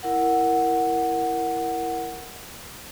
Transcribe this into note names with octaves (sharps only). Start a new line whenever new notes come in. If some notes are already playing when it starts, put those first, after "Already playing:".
E4 A#4 F#5